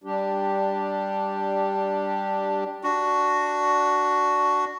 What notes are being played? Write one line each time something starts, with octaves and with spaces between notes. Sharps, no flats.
G3 D4 G4
D4 F#4